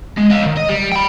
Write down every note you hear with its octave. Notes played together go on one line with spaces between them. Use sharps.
G#3
D#5 F5
D#3 F3
D#5
G3
G5 B5